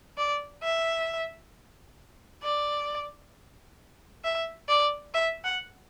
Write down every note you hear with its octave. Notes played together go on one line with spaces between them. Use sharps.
D5
E5
D5
E5
D5
E5
F#5